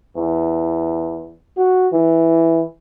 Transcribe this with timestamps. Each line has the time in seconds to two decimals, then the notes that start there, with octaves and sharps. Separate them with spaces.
0.16 E2
1.57 F#4
1.93 E3